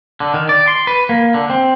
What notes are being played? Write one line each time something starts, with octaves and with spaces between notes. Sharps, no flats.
D3
D#3
D5
C6
B4
A#3
D3
C4